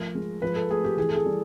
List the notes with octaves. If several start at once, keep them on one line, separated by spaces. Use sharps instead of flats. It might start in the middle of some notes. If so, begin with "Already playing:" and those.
Already playing: F3 A3 A#4
G#3
F3 B4
A4
A3 G#4
G4
E3 G#4
A4
G#4
G3